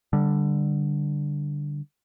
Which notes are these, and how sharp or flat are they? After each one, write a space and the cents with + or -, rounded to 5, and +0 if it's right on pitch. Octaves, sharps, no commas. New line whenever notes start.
D3 +0 G3 +5